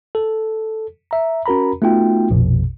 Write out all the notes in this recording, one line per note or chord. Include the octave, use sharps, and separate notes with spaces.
A4
E5 A#5
C#4 F#4 A#4 A#5 B5
A3 B3 D#4 F4 F#4 G5
A#1 F2 B2